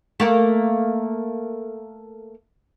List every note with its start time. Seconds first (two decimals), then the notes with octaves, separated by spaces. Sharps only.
0.20 A3 A#3 A#4